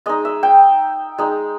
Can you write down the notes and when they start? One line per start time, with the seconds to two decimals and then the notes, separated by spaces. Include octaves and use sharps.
0.06 G#3 D#4 D#5
0.25 E5
0.43 G5
1.18 G#3 D#4